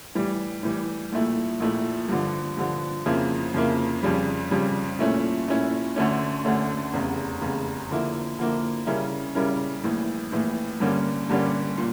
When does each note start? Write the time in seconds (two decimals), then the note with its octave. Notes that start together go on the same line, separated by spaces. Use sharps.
0.15 A2 E3 G3
0.63 A2 E3 G3
1.12 A#1 A#2 A3 E4
1.60 A#1 A#2 A3 E4
2.09 G2 D3 F3
2.57 G2 D3 F3
3.06 F2 C#3 F3 A#3 E4
3.54 F2 C#3 F3 A#3 E4
4.03 F2 C#3 G3
4.51 F2 C#3 G3
4.99 A#2 A3 C#4 E4
5.48 A#2 A3 C#4 E4
5.96 D2 D3 A3 C#4
6.45 D2 D3 A3 C#4
6.93 F1 E2 C#3
7.41 F1 E2 C#3
7.90 D3 F3 A#3 E4
8.39 D3 F3 A#3 E4
8.87 C#3 G3 C#4 E4 A#4
9.35 C#3 G3 C#4 E4 A#4
9.84 A#1 A2 E3
10.32 A#1 A2 E3
10.80 G2 D3 G3 A#3 C#4
11.29 G2 D3 G3 A#3 C#4
11.78 A#2